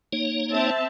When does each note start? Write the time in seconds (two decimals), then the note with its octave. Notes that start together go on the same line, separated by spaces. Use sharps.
0.13 A#3 D#4 C#5
0.54 C4 E5 A5